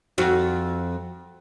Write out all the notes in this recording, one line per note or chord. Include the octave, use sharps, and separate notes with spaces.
F2 F#4